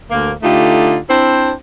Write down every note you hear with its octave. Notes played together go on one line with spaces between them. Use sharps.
D2 A#3
D3 A3 D#4 F4 G4
C4 D4 E4 C5